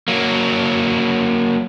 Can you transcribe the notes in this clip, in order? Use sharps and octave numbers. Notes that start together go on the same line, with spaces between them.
F#3 A#3